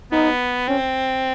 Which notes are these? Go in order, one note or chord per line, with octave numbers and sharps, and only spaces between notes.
B3 D#4
C4 C#4